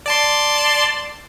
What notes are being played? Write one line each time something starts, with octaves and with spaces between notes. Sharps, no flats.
D5 A5 C6